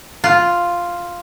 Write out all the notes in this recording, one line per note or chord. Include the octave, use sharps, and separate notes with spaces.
F4